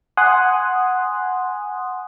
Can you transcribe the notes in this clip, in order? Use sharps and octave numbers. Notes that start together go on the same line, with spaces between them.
F#5 G#5 C6 D#6 F#6